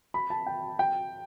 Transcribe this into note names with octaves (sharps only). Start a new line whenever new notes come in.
B5
A5
G5
G5